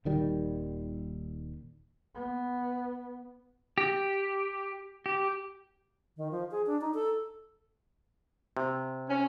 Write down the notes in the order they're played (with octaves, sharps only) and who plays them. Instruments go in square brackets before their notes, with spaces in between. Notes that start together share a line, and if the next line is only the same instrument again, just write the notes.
[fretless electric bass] D#1 D#3 G3
[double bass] B3
[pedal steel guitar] G4
G4
[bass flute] D#3
F3
G#4
D4
D#4
A4
[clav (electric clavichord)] C3
[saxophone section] C#4